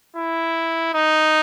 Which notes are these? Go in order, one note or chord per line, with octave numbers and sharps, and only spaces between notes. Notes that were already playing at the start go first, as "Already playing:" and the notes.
E4
D#4